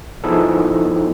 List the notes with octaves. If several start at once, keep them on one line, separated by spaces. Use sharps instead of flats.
F3 B3 D#4 E4 G#4 A4